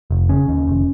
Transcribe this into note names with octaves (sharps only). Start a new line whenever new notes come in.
F1
C#3 C#4
D#2
F1